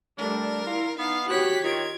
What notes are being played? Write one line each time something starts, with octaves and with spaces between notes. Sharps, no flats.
G3 A3 D4 A#4
E4 F4
B3 D#4 F5
F#4 G4 C#5 F#6 B6
D#3 F4 G#6 D7